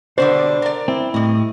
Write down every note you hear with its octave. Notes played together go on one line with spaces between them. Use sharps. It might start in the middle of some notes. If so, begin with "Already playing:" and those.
B2 D3 G3 D4 C5
A#4 D5
C4 E4
A2 G3 D#5